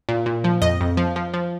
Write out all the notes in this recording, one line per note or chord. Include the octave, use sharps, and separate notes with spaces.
A#2
A#2
F3
F2 D#5
F2
F3
F3
F3